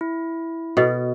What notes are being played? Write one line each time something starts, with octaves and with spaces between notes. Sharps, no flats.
E4
B2 A4 B4 D#5